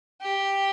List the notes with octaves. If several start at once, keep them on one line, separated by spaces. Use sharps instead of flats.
G4